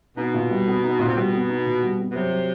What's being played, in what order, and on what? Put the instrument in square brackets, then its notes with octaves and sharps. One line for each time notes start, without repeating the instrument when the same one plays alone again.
[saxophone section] B2 [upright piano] D#4
[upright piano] A#2
G3
B3
D#4
A#2
[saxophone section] C3
[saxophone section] B2 [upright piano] G3
[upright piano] B3
D#4
A#2
G3
B3
[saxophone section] B2
[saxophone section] C3 [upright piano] F#3
[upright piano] F#3